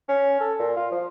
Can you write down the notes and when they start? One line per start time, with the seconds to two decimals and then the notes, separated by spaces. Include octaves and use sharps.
0.09 C#4
0.40 A4
0.59 A#2
0.77 F4
0.91 F3